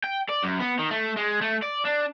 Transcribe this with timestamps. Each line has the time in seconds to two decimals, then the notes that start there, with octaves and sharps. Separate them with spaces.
0.04 G5
0.29 D5
0.43 F#2
0.60 B3
0.79 D#3
0.91 A3
1.17 G#3
1.42 A3
1.63 D5
1.85 D4